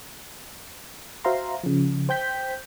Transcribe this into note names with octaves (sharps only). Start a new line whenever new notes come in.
F#4 C5 E5 F5 A#5 C6
C#3 F3
C5 G5 G6 B6